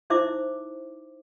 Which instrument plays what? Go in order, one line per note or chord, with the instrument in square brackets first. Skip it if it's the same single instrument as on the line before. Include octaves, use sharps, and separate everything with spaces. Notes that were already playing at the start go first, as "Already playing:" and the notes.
[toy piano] D#4 E4 C5 E5 D6